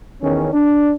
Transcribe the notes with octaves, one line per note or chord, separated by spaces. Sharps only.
E2 D#3 C#4
D4